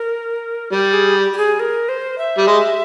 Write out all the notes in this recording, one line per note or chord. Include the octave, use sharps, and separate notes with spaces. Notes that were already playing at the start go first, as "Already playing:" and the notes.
Already playing: A#4
G3 G4
G#4
G4
G4
G#4
A#4
C5
E5
G3
G#3